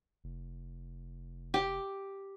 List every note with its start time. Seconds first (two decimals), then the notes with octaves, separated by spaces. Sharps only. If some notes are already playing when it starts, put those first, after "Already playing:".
0.24 F1
1.54 G4